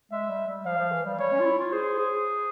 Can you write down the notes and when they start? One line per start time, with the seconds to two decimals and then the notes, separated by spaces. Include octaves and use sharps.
0.12 G#3 E5
0.30 G3
0.48 G3
0.65 F3 F5
0.78 F3
0.92 E3
1.05 G3
1.19 G3 C#5
1.32 C#4
1.40 F4
1.45 E4
1.59 F4
1.72 G#4 C5
1.98 G#4